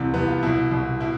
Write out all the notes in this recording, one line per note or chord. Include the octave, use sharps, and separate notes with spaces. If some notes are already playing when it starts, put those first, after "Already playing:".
Already playing: C2 C3 E3 C4
C2 C3 E3 B3
F4
C2 B2 E4
C2 B2
B2 E4